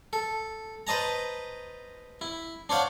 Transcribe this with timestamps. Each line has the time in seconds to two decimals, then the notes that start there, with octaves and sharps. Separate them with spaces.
0.13 A4
0.87 B4 C5 D#5 A5 A#5
2.21 E4
2.69 D4 C5 C#5 F5 F#5